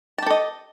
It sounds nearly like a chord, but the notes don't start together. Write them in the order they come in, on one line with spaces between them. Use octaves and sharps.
A5 G4 A4 D#5